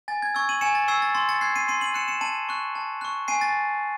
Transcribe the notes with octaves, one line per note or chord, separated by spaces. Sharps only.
G#5 A6
G#6
C#6 E6 G#6
D#7 F#7
G#5 C#7 E7
A6
C#6 E6 G#6 C7
A6
C6 A6
A6 C#7
F#6 G#6 C7
C7 D#7
C6 C7 D#7
D#7 F#7
F#6 C#7 E7
C#7 E7
A5 D#7 F#7
C#6 F#6
A5
C#6 F#6
G#5 C7 D#7
A6